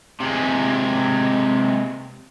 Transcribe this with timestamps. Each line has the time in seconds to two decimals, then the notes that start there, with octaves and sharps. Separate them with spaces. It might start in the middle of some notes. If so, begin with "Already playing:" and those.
0.20 C3 G#3